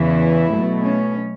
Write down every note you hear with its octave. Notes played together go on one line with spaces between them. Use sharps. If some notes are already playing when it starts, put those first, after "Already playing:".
Already playing: E2 C#3 E3 E4
B2 F#3 A3
C#4